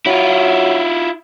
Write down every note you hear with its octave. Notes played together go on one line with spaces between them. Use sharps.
F#3 E4 F4